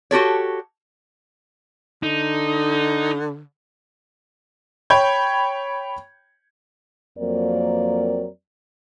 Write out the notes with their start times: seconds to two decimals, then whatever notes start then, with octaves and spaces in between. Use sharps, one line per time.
0.11 F#4 G4 A4 C#5
2.03 D3 D#4
4.90 C#5 G5 B5 G6 G#6
7.19 F2 F#3 A#3 C4 A#4 D5